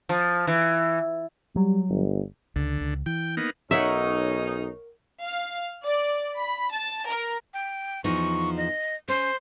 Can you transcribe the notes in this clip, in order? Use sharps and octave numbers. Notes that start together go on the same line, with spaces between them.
F3
E3
F#3 G3
G1
C#2 D3
C#2
E3 G5
A#3 B3 D#4
B1 C#4 D#4 A#4 C#5 E5 F#5
F5
D5
B5
A5
A#4
G5
E2 F3 D#4 C#6
D#5
C#4 C5